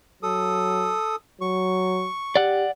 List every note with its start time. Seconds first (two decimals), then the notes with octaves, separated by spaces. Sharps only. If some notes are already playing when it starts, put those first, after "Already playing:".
0.23 F#3 A4 D#6
1.41 F#3 C#6
2.36 G4 D5 F#5